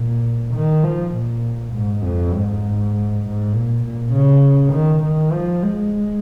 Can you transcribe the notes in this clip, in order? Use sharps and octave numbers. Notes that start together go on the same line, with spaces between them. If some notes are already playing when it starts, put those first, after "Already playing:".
Already playing: A#2
D#3
F3
A#2
G#2
F2
G#2
G#2
A#2
A#2
C#3
D#3
D#3
F3
G#3